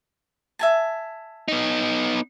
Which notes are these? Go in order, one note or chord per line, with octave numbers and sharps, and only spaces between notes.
E5 G#5 A5
B3 D#4